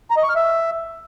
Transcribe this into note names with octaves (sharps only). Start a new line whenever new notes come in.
A#5
D#5
C#6
F6
E5